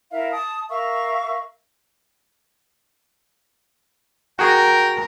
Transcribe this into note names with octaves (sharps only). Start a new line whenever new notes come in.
E4 A#4 E5 F5
A5 D#6
A#4 E5 F5 C#6
F#4 G#4 A#4 G5